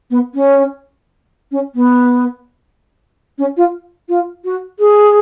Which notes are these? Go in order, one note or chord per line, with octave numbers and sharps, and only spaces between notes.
B3
C#4
C#4
B3
C#4
F4
F4
F#4
G#4